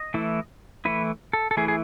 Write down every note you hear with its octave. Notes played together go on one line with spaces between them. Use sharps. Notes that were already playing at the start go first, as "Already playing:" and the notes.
Already playing: D#5
E3 A3 E4
E3 A3 E4 B4
A4
A4
E3 A3 E4 G#4
G#4